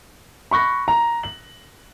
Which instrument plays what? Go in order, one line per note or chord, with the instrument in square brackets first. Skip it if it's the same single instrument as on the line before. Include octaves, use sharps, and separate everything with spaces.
[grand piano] B5 C#6 F#6 A#6
A#5
F#7